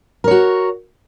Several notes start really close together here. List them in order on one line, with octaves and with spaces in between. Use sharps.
A#4 C#5 F#4